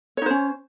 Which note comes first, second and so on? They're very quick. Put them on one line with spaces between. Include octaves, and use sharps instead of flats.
C#5 D#4 C5 C#4